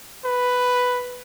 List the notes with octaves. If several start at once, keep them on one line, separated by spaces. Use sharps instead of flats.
B4